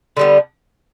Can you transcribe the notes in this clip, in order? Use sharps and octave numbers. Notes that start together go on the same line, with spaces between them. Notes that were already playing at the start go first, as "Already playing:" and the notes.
D3 G3 B3